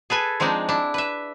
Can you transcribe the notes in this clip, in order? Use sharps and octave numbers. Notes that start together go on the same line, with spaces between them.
G#4 A4 B4 G#5
F3 G#3 C4 D4 D#4
D4 E4
B4 E5